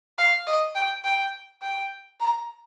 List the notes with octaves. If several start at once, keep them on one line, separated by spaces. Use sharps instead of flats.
F5
D#5
G5
G5
G5
A#5